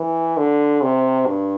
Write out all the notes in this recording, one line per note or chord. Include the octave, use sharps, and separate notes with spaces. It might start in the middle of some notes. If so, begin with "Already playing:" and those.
Already playing: E3
D3
C3
G2